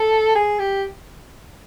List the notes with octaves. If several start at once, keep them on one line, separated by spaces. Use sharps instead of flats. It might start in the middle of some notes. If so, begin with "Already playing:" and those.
Already playing: A4
G#4
G4